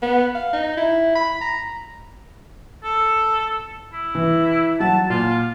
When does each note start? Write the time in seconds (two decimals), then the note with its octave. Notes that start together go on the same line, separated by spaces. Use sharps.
0.02 B3
0.35 F5
0.53 D#4
0.77 E4
1.15 B5
1.41 A#5
2.84 A4
3.93 E4
4.15 E3
4.80 F#3 F#5 A5
5.10 A#2 F4